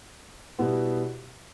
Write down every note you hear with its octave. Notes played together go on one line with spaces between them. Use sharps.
B2 G3 B3 E4